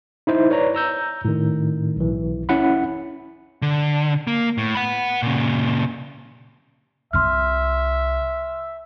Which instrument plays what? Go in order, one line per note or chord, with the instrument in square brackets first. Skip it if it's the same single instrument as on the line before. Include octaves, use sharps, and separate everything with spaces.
[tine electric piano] D#4 E4 C5
B4 C#5 D5 A#5
A#5 E6 G6
A2 D#3
B1 E3
C#4 E4 F#5 B5
[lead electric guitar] D3
A#3
A2
F#5 B5
A#2 C#3
[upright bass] C2 F4 [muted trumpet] E5 [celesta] C6 F6